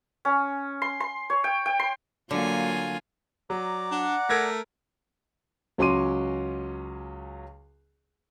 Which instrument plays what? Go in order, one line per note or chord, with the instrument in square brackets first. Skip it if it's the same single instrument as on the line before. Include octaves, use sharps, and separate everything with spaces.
[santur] C#4
C6
C6
C#5
G5
G5
C6
[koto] D3 [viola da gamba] F#3 A#3 [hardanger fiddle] F4 G#5
[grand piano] F#3 [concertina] D5 A#5 D6
[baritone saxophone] D4 [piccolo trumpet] F#5
[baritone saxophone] A3 [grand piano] A#4 G#6 A#6
[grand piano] C#2 F#3 C#4 C6 D6 D#7